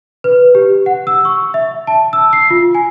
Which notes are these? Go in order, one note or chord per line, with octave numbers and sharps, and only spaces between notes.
B4
G4
F#5
E6
C#6
E5
A5
E6
C7
F4
G#5